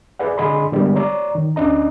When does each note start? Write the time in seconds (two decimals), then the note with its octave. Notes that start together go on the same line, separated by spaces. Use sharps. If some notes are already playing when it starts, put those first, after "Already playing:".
0.19 G#4 B4 D5 F#5
0.38 D3 D4 G#4 D#5 B5 C6
0.72 D3 G3 G#3 A#3 B3
0.95 C#5 D5 A#5
1.35 D#3
1.56 D2 C#4 D4 D#5 A#5